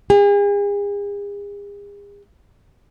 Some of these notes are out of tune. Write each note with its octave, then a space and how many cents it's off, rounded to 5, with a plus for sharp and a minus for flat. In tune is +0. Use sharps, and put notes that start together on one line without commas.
G#4 -40